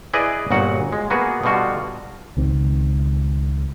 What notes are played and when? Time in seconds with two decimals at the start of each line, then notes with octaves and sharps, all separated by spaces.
0.14 E4 G#4 B4 D5 D#5
0.51 G1 A#2 F#4 F#5
0.93 G#3
1.10 A#3 B3 F#4 G#4
1.43 B2 D3 G3 F4 F#4
2.37 C#2 D#3 C4